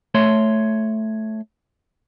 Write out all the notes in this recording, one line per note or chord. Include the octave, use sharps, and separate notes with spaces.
A3 C#5 C6